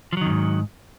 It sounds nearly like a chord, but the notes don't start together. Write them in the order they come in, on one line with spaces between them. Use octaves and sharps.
F3 F#3 D#3 F2 G#2